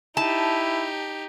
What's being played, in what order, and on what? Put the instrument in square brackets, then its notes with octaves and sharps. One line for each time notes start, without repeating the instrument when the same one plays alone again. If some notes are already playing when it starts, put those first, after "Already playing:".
[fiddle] D#4 G4 [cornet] E4 [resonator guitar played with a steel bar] A5